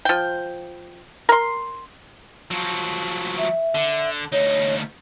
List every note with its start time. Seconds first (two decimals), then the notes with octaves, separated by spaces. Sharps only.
0.05 F3 G5
1.29 A#4 C6
2.51 F3 F#3
3.38 E5
3.75 D3
4.32 D2 D#4 C#5